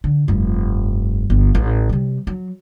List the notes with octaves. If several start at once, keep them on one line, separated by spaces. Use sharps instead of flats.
D3
F1 G2
G1
A1
C3 G3
F#3